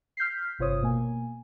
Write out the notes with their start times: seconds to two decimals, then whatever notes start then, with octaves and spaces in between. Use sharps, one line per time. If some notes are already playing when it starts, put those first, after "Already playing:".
0.17 F6 G6 B6 C7
0.59 G1 C3 F4 C5 C#5 D#6
0.82 B2 A#3 G#5